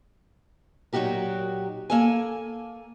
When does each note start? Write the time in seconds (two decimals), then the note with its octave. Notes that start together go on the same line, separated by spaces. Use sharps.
0.93 A#2 F#3 D#4 F#4 G4 A#4
1.90 A#3 A4 G#5